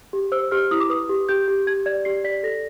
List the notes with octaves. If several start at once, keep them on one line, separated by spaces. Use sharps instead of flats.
G4
C5 E6
G4 F6
E4 D#6
D6
B4 D#6
G4
G4 G6
G4
G4 G#6
D5 G#6
G4 C7
D5 B6
A4 A#6